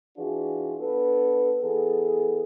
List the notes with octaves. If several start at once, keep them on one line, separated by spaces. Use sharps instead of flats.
E3 D4 F4 F#4 G#4
B3 D4 A4 B4
E3 B3 G#4 A4